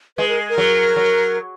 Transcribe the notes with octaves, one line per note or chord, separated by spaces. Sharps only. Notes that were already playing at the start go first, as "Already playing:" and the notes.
G#3 B4
A#4
A#4
F#3
F#3